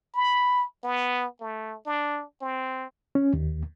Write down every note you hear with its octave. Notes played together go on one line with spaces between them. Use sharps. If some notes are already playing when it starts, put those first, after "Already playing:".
B5
B3
A3
D4
C4
C#4
D#2